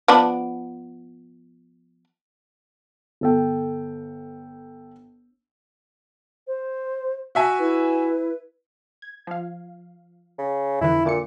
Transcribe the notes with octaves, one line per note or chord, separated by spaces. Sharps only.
F3 B3 D4
G1 A4 G5
C5
F#4 E5 G#5
E4 B4
G#6
F3 F5
C#3
F2 D3 E3 E4
A#2 D3 D6 C#7